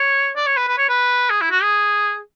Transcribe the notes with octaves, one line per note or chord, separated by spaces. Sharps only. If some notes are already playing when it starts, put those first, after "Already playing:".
Already playing: C#5
D5
C#5
B4
B4
C#5
B4
G#4
E4
F#4
G#4